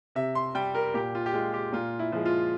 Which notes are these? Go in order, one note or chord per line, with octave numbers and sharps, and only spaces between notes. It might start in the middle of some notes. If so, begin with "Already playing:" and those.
C3 E5
C6
G3 G5
A#4
A#2 G4
F4
G4
G#3 F4
G4
A#2 F4
E4
F3 G#3
F4